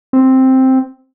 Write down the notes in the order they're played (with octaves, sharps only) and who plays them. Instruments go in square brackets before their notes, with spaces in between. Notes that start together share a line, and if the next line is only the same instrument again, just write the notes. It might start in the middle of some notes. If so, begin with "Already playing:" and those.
[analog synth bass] C4